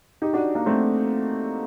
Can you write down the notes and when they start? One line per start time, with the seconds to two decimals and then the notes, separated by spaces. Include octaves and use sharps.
0.22 D#4 G4
0.33 D4 F#4
0.55 A#3 D4
0.66 A3 C4